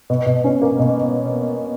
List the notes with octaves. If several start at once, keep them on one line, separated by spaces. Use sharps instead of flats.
B2
B2
C#4
A#3
B2